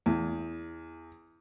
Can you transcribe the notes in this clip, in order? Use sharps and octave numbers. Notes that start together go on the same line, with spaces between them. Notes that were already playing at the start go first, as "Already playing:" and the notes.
E2